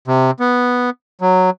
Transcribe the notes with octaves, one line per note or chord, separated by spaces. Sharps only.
C3
B3
F#3